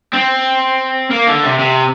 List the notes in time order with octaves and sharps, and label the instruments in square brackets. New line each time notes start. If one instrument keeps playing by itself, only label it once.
[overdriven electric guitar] C4
A#3
D3
C3
C3